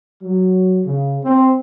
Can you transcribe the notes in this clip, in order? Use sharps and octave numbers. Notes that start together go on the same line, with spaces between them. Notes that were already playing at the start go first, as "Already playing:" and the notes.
F#3
C#3
C4